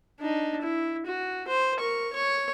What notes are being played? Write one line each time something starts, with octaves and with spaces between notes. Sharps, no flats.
D4 D#4
E4
F#4
C5
A#4 C#6
C#5 C#6